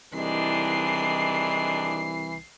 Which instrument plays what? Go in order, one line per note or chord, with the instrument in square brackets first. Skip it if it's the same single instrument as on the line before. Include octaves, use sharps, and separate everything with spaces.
[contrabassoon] C2 [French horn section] D#3 G#3 D4 [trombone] E3 [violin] C7